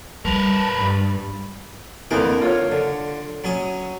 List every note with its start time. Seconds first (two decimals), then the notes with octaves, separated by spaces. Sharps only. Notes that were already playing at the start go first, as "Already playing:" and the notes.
0.25 G3 A#4 B4 A5
0.77 G2 B5
2.11 F2 D3 E3 A#3 A#4
2.42 F4 C#5 F6
2.72 D3
3.44 F#3 C#4 D#6